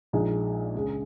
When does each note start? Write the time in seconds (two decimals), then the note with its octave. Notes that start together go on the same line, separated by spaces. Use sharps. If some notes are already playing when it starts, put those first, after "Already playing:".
0.13 A#1 A#2 G#3 D#4 G#4
0.75 C#2 C#3 G#3